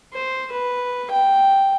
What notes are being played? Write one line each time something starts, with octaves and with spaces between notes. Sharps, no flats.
C5
B4
G5